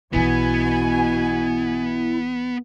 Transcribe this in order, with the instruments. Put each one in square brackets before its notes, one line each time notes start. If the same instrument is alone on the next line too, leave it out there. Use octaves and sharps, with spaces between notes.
[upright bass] B1 E3 [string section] B2 G#5 [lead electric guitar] B3 [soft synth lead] E4